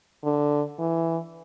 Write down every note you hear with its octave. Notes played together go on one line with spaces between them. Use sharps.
D3
E3